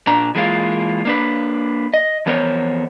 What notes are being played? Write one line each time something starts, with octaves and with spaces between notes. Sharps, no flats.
A#2 D4 A#5
E3 G#3 A#3 D4 F4
A#3 D4 B4
D#5
F2 E3 B3 A#4 C5 C#5